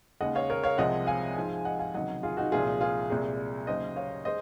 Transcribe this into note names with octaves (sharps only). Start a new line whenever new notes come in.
D#2 C#3 G#3 D#5 F#5
C#5 F5
A#4 C#5
C#5 F5
C2 C3 F3 G#3 D#5 F#5
F5 G#5
G#2 F3 G#3
D#5 F#5
F5 G#5
C#2 C3 D#3 F#3 D#5 F#5
F4 G#4
D#4 F#4
C2 A#2 F3 G#3 F4 G#4
F4 G#4
C2 A#2 G#3
D#2 C#3 F#3 C5 D#5
C#5 F5
G#3 C5 D#5